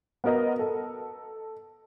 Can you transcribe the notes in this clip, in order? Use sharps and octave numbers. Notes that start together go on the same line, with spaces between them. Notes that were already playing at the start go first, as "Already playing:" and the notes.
B3 F#4 A#4 D#5
A4